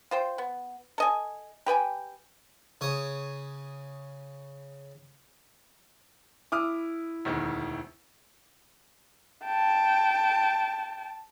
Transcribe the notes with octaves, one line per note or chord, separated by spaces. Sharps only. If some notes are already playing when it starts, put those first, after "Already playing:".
F4 C5 G5
B3
A4 D#5 G#5
G4 B4 G5 G#5
C#3 C#5 D#6
E4 D6 D#6 F6
E1 D2 D#3
G5 A5